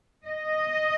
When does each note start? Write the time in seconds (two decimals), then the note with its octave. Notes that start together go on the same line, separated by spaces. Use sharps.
0.26 D#5